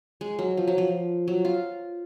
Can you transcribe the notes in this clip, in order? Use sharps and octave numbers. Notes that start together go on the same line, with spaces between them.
G#3
F#3
F3
F#3
F3
F#3
F4